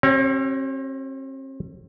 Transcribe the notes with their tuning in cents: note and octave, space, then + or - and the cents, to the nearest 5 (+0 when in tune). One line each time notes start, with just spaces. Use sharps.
C4 +45 G4 -35 C#5 +0